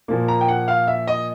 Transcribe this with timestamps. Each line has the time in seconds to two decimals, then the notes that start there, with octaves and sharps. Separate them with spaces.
0.08 A#2 F3 A#3
0.28 A#5
0.41 G5
0.48 F#5
0.68 F5
0.87 E5
1.07 D#5